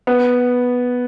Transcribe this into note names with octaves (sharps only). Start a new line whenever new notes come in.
B3